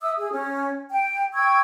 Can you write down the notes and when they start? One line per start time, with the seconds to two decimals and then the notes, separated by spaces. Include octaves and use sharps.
0.01 E5 D#6 E6
0.16 G#4
0.32 C#4
0.90 G5
1.34 G5 C#6 E6 G#6